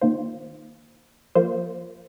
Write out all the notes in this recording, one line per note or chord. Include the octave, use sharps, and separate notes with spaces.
D#3 A#3 F4 C5
F3 A#3 F4 C5